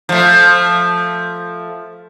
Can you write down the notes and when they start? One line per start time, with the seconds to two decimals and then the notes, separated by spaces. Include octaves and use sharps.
0.09 F3 A3